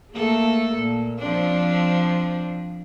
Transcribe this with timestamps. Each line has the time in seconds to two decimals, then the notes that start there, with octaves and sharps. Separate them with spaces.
0.12 A3 A#3 A4
0.73 A#2
1.19 F3 C4 D4